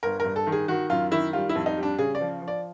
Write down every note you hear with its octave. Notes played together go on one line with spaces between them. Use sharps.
G1 A#4
A#4
G2
A4
D#3
G#4
D#3 F#4
F#2 F4
D#3 E4
G3 F4
E4
F2
D#4
G3
D4
C#3 G#4
D5
F3
F3
D5